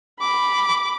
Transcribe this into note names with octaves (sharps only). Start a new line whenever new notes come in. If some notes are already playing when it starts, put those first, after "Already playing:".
B5 D6